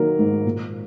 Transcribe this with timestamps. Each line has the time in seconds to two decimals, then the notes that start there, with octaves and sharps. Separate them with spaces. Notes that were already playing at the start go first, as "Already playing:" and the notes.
Already playing: D#3 F#3 A#3 A#4
0.19 G#2
0.45 A#2